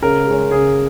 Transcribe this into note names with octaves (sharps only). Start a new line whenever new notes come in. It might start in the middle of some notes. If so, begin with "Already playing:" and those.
C#3 A#4
G#3 C#4
C#3 G#4